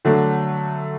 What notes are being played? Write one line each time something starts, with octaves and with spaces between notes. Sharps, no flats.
D3 F#3 A3 D4